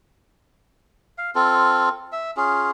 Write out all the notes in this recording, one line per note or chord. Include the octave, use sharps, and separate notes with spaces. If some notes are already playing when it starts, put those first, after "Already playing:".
F5
C4 F4 A4
E5
C#4 F4 G#4